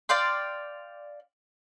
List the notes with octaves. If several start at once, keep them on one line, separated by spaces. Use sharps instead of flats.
D5 F5 G5 C6